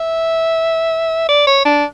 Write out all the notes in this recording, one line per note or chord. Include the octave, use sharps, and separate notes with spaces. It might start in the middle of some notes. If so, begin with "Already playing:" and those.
Already playing: E5
D5
C#5
D4